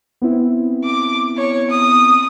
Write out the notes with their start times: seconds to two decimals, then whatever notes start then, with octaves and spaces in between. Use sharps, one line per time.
0.21 B3 C4 E4
0.85 D6
1.38 C#5
1.71 D#6